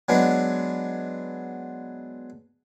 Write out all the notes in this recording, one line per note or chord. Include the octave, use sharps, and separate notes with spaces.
F#3 G#3 B3 D4